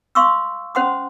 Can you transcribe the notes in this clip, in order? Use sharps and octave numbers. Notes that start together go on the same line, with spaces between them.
F5 C6 C#6 D#6 E6
C#4 C5 F#5 C6 D#6